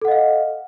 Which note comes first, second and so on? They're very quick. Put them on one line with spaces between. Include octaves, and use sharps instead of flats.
A4 F#5 D#5 F5